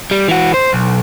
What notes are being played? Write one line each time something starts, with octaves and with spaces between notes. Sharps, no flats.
G3
E3 F#4
C5
B1